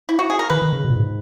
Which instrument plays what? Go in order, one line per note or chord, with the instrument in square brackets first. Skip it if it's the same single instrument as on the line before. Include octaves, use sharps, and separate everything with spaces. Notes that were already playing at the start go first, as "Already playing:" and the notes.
[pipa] E4
F#4
G#4
A#4
[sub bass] D#3 [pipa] B4
[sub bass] D#3
C#3
B2
A#2
G#2